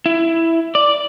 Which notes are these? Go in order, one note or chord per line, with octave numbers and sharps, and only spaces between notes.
E4
D5